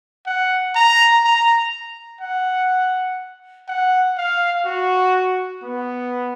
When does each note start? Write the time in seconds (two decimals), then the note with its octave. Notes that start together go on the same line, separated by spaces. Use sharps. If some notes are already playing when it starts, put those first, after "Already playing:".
0.27 F#5
0.75 A#5
1.24 A#5
2.21 F#5
3.68 F#5
4.17 F5
4.65 F#4
5.63 B3